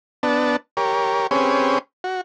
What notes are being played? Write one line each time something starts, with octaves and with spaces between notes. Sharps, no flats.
B3 D4 A5
G4 A#4 C#5
C4 C#4 G4 G#4 B4 C#5
F#4